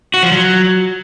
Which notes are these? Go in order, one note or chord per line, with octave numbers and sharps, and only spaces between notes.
F#4
F3
F#3